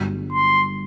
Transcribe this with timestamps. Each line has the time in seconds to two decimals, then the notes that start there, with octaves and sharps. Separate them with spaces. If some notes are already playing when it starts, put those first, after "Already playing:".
Already playing: G1 G2 F#3
0.33 C6